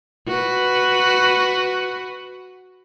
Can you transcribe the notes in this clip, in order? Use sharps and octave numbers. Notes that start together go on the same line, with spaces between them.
F#4 B4